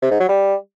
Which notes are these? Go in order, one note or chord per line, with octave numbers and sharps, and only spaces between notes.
C3
G#2
F#3
G3